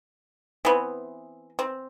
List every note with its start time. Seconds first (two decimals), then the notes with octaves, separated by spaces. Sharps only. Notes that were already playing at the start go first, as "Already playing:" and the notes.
0.65 E3 B3 C4
1.59 C4